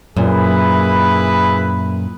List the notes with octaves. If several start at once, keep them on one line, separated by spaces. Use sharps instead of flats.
F#2 A#2 E4 G#4 B4